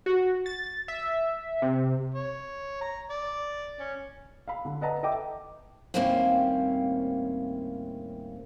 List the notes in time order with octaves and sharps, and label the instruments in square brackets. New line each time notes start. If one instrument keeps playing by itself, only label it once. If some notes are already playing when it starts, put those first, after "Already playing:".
[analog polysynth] F#4
A6
E5
C3
[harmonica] C#5
A#5
D5
C#4
[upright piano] F5 B5
D3
B4 D5 D#5 F#5 A5 A#5
A4 D#5 E5 G5 D6
[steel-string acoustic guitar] D#2 A2 G3 A#3 C4 C#4